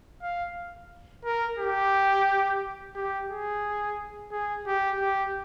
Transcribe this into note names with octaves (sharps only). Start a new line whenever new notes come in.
F5
A#4
G4
G4
G#4
G#4
G4
G4